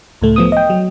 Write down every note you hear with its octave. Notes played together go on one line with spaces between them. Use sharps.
C#2 A2 A3
F3 B3 D#6
D#5 G5
F#3